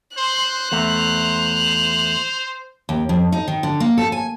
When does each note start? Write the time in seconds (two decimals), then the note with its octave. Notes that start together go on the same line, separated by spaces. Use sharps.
0.17 C5 C6 F#6
0.72 E2 A3 C5 F7
2.89 D#2
3.09 F2
3.32 D#4
3.48 D#3
3.63 D3
3.80 A#3
3.98 A4
4.12 G#5